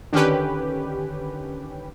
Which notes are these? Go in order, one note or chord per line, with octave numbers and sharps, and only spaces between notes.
D3 D#3 C#4 G4 B4